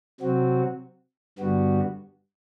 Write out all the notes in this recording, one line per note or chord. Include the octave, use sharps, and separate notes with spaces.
C3 F#3 C4 F#4
G2 D3 G3 B3 F#4